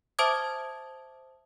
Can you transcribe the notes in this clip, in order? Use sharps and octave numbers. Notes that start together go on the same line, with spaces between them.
C5 E5 A5 D6 D#6 G#6